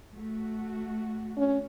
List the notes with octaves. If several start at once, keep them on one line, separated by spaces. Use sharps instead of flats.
A3 F#4
C#4